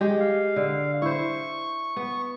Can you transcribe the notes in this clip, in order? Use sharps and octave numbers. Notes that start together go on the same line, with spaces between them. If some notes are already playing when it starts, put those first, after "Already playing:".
G#3 G4
F5
D3
E4 C5 C#6
B3